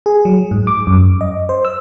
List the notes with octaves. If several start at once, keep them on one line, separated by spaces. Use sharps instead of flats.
G#4
F#3
G#2
D6
F#2
D#5
C5
E6